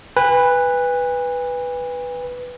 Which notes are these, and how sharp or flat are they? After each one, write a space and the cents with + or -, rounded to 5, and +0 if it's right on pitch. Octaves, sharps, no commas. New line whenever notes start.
B4 +0 G#5 -40